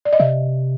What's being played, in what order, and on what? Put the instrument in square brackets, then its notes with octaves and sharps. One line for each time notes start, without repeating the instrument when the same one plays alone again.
[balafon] D5
D#5
[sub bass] C3 [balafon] E5